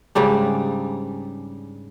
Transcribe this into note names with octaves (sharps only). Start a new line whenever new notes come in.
G#2 C#3 G3 D4